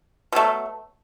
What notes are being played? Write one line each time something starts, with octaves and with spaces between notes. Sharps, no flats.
B2 F#3 A3